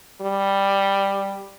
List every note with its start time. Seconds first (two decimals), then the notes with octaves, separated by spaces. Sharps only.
0.21 G3